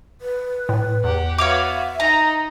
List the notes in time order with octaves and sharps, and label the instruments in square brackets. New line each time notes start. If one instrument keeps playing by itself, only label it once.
[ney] B4
[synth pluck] A2
[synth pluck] E2 [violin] G4 F#5
[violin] B3 F#4 [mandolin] C#5 F5 D6 [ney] E5
[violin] D#4 D#5 [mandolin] A#5